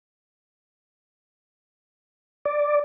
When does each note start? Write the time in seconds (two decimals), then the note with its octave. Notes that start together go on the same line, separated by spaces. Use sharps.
2.45 D5